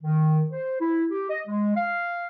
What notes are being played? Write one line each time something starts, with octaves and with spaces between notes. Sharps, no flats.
D#3
C5
E4
G4
D#5
G#3
F5